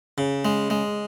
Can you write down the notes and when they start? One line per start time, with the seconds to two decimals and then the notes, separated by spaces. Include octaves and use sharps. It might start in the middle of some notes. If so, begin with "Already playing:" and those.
0.18 C#3
0.45 G#3
0.70 G#3